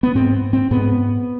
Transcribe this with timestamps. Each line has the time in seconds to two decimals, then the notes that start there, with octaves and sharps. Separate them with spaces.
0.03 B3
0.15 G#2 C4
0.53 C4
0.71 G#2 B3